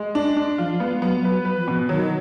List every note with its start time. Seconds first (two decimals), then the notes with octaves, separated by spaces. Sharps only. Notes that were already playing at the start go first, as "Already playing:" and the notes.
Already playing: G#3
0.15 D4
0.37 D4
0.58 F3 F4
0.80 G#3 B3
1.02 F#3 B3
1.24 F#3 B4
1.45 B4
1.57 F3
1.68 B2
1.89 D#3 F#3